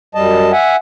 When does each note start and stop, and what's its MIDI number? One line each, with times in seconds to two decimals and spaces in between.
0.15 0.52 42
0.15 0.52 55
0.15 0.52 75
0.15 0.52 81
0.52 0.76 76
0.52 0.76 78
0.52 0.76 80